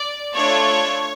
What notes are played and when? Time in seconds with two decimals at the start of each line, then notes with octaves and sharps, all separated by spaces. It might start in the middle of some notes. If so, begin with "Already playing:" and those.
Already playing: D5
0.35 A3 D4 F4 A4 C#5